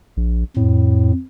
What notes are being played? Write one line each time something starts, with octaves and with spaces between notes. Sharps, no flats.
A#1
F2 A2